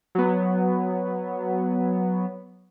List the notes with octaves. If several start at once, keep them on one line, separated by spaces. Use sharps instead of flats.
F#3 B3